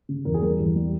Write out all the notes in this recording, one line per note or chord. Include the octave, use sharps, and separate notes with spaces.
C#3
E2 A#4
G#4
G3 A#4
E2
G3